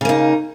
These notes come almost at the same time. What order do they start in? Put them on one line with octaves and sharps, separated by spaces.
C#3 A#3 D#4